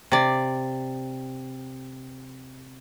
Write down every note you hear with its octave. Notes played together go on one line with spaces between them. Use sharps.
C3 D5